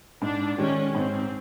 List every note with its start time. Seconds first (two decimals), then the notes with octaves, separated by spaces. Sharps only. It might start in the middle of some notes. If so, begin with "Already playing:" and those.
0.21 G#2 D4
0.58 D#3 G#3 C#4
0.95 G#2 C4